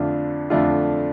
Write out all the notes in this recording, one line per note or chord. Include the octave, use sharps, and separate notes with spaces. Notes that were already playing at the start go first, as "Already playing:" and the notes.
Already playing: F2 D3 A3 D4 F4
F2 D3 A3 D4 F4